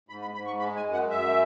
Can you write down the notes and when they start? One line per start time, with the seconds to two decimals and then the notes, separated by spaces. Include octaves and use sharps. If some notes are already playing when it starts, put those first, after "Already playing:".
0.09 G#2 B5
0.22 B5
0.34 G#2 B5
0.47 C#6
0.59 G#3 B5
0.76 G#5
0.85 F#2
0.93 F#5
1.10 F#2 E5